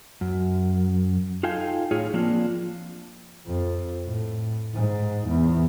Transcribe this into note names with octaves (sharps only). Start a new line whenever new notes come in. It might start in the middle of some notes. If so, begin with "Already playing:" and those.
F#2
D#4 F4 A4 F5 G5 G#5
A2 F4 G#4 C#5
F3 A#3 C4 D4 F4
F2
A2
G#2
E2